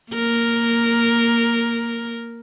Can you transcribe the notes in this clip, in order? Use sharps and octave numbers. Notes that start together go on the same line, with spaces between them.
A#3 A#4